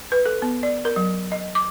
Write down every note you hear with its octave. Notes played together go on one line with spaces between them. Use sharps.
B4
A4
B3
D5
A#4
F#3
D#5
D6